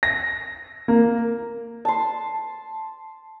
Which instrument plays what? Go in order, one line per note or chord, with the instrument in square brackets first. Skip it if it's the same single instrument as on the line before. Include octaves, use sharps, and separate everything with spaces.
[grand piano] A#6
A#3
[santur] A5 C6